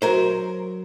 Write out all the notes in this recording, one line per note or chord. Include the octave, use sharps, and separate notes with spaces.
F#3 A#4 C5